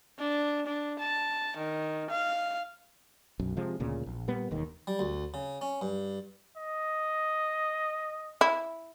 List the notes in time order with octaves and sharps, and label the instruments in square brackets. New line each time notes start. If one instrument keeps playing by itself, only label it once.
[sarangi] D4
D4
A5
D#3
F5
[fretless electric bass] B1 F#2
C3 F3 G#3
D2 A#2 C#3
A#1
A#2 G3 B3
E1 D#2 D#3
[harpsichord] G3
D2
C#3
C#4
G2
[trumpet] D#5
[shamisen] E4